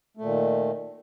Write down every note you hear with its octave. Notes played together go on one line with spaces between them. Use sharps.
A#2 D#3 A3